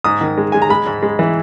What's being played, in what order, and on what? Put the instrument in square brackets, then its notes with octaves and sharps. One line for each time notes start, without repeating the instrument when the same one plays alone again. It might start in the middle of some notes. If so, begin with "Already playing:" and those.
[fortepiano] G#2 D#6
D#3
G#3
G#3 G#5
A#5
G#3 B5
G#2
G#3
E3